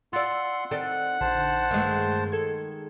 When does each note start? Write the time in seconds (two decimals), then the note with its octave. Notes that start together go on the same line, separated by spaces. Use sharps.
0.13 F4 D5 F#5 C6 E6
0.71 D#3 C4 A4 D5 F#5
1.21 A#1 D3 C5 A5
1.71 G2 D#3 G#3 A3
2.32 A4 G#6